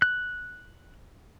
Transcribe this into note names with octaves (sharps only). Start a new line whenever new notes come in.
F#6